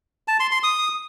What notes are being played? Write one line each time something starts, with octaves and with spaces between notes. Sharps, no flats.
A5
C6
C6
D#6